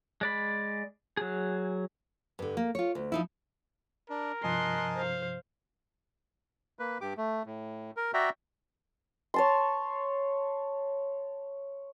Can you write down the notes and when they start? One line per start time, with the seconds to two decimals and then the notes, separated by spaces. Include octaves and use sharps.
0.21 G#3 D5 B5
1.17 F#3 G#4
2.39 G2 D3
2.57 A#3
2.75 F4 C#5
2.95 D2
3.12 F3 D#4 E4
4.10 D4 A#4
4.44 G2 C3 F3 D#5 G#5 A5 C6 F#6
4.96 C5 F5
6.79 A#3 B4
7.01 G2 G4 D6
7.17 A3
7.46 A2
7.97 A#4
8.14 F#4 D5 E5 G5 A#5
9.34 C#5 A5 C6